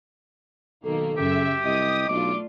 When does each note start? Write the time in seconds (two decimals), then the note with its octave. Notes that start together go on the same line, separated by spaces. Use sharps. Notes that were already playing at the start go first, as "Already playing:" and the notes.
0.84 B1 D#3 A#3 A4
1.18 F#2 C#3 G4 E5
1.65 C2 D#5 D#6
2.09 B1 A3 D4 F4 D6